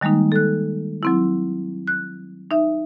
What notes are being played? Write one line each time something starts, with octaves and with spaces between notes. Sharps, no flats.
D#3 G3 G#3 A#3 D#4
A4 F#6
F#3 C4 E4
F#6
D#4 E5